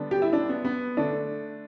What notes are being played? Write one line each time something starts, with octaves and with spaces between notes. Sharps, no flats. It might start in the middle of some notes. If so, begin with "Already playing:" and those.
Already playing: D3 G3 B3 D4
G4
E4
D4
B3
B3
D3 A3 D4